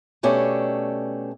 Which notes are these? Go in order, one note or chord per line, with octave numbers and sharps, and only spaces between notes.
B2 A3 C#4 D4 G4